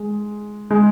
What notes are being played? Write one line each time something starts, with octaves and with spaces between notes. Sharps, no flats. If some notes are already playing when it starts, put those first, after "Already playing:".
Already playing: G#3
G#3